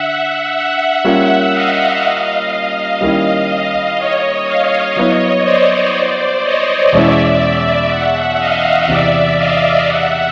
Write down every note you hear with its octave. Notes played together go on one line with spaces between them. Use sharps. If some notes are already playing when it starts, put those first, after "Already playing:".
Already playing: D3 E5 F#5
E5 F#5
G3 A#3 C#4 F4
D#5 F5
D#3 G3 A#3 C#4 E4
D#5 F5
C#5 D#5
D#5 F5
F#3 B3 E4 C#5 D#5
C5 D5
C#5 D#5
E2 B2 G#3 C#4 E4 D5 E5
E5 F#5
D#5 F5
E2 C3 E3 D5 E5
D#5 F5
E5 F#5